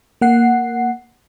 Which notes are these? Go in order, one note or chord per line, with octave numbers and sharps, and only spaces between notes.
A#3 F#5 C7